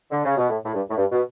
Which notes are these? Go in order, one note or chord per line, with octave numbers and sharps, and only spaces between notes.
D3
C#3
B2
A2
A2
G2
A2
G2
B2